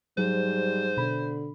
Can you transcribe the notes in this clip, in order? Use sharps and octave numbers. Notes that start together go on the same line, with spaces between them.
G#2 F#3 G3 C5
B2 D3 B5